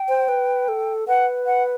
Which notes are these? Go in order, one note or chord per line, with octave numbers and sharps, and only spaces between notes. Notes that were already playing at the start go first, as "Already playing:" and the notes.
Already playing: G5
C5
B4
A4
B4 F#5
F#5